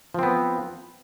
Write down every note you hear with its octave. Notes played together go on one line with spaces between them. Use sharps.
F3 B3 C4